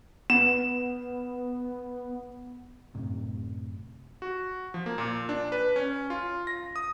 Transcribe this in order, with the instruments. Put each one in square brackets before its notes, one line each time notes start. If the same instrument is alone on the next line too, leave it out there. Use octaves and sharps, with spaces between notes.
[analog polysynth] B3 [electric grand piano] E7
[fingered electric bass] F#2 A2 C3
[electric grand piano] F#4
F3
A#3
A#2
D4
B4
C#4
F4
A#6
D#6